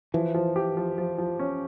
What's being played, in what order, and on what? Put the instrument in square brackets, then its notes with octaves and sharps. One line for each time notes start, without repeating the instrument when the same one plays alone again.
[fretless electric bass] E3 [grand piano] F3
[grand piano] F3
G4
F3
F3
F3
C#4